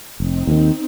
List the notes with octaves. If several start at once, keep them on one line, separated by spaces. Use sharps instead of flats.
F1 C4 D#4
D#2 D#3